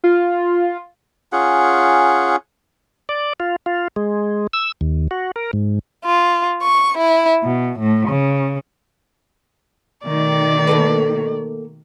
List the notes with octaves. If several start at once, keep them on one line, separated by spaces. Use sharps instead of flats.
F4
C#4 F4 G#4 F#5
D5
F4
F4
G#3
E6
D#2
F#4
A#4
G#2
F4
C#6
E4
B2
A2
C#3
B2 D#3 A3 D5
A#3 A4 B4